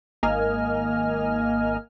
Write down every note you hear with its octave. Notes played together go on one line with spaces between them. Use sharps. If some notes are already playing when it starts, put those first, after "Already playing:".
G#1 A#3 D#5 G#5 F6